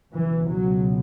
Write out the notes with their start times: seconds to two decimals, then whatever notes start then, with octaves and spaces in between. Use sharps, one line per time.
0.12 C#2 B2 E3
0.49 F#3